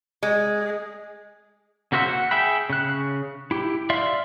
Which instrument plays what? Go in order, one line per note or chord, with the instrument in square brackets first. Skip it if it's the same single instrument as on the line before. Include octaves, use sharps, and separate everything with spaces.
[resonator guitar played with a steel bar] G#3
[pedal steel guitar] C#3 A#3 F#4 C5 E5
F#5
G#4 E5 G5 B5
C#3 F#6
E4 G4
D5 E5 F5 C6